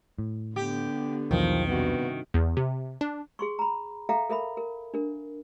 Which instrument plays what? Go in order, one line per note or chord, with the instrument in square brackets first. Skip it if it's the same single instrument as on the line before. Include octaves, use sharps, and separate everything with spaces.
[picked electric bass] A2
[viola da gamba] D3 B3 [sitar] G4
[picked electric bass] B1 E2 F#3 [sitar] D#3 [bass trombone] F3
[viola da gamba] G2 C3 F#4 [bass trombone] B3
[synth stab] E2
C3
D4
[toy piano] G#4 C6 C#6
A#5 B5
A4 E5 F5 G5 A#5
A4 A#4 E5 B5
A#4
D4 A#4